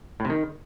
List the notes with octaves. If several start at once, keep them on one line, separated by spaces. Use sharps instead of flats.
A2
C3
D#3